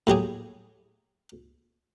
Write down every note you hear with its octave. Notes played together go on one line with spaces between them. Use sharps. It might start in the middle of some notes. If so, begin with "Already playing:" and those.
A2 F#3 G4 G#4